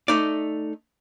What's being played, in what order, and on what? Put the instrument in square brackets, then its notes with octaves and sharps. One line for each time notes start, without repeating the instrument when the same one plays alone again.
[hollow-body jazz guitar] A3 D#4 D5